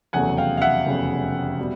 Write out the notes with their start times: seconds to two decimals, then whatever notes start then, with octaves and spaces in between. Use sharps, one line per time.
0.13 F1 E2 C#3 F#3 A3 F#5 G#5
0.37 F5 G5
0.57 F5
0.61 E5 F#5
0.86 F1 E2 C#3 F#3 A3
1.60 B2 G3